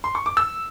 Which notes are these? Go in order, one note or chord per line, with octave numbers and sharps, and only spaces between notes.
C6
C#6
D6
E6